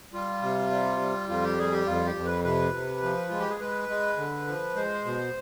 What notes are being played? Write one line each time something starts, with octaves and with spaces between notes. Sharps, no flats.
G3 F4
C3
G3
G3
F2 F4
G4
G3 G#4
G4
F2 F4
G4
F2
B4
C3 B4
C3
F3
G#3 F4
G4
G#4
G#3 B4
G#3
D3
F3
G#3 C5
B2